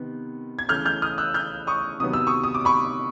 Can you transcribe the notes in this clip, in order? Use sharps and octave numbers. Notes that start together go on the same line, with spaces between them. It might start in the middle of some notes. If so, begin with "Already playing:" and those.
Already playing: C3 D#3 B3
G#6
C#3 E3 A3 F6 G6
F6 G6
D#6 F6
E6 F#6
F6 G6
C#6 D#6
C3 D#3 F#3 B3 D#6
E6
C#6 D#6
D#6
D6
B5 C#6